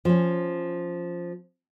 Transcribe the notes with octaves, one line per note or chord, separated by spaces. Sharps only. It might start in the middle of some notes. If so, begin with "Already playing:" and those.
F3 C#4